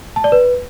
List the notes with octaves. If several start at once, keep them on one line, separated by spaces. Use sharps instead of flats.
A5
D5
B4